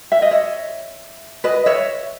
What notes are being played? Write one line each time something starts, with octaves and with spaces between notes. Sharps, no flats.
E5
D#5
C#5 E5
B4 D#5
C#5 E5